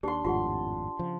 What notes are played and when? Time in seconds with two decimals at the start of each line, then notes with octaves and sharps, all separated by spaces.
0.03 D#2 D4 G4 C6
0.25 G#1 F2 A2 F4 G4 F#5 C6
0.99 C#3 F3